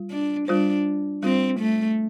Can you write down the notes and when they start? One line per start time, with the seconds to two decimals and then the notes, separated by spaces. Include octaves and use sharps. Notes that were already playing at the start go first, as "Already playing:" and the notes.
Already playing: G3 F4
0.10 D4
0.48 G3 D4 F4 C5
1.23 G3 C4 F4 C5
1.60 A3